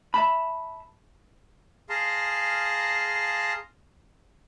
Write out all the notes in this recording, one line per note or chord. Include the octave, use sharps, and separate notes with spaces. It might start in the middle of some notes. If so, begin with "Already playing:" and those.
E5 A5 B5
G#4 F5 A5 A#5 C6